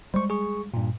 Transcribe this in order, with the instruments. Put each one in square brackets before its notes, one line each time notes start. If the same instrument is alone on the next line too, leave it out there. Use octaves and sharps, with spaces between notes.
[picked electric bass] G3 G#3 [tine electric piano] C5 C#6
[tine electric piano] G#4 C#6
G2 A#2